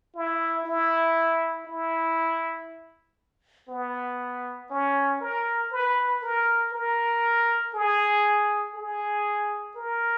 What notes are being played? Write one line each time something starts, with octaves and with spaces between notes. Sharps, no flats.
E4
E4
E4
B3
C#4
A#4
B4
A#4
A#4
G#4
G#4
A#4